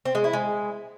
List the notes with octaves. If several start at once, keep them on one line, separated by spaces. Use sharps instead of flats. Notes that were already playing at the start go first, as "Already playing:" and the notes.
C4
G#3
E4
G#3